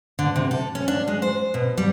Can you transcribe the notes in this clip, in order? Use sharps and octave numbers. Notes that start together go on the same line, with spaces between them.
D3
C3
A4
C#4
D4
G#3
C5
B2
G3